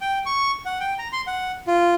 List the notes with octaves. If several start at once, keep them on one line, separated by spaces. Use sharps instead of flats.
G5
C#6
F#5
G5
A#5
C6
F#5
F4